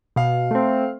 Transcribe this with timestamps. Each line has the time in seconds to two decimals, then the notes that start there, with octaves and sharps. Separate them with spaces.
0.16 B2 F5
0.51 A3 C4